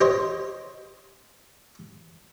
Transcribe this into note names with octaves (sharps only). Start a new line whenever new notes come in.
G4 C5 C#5 D#5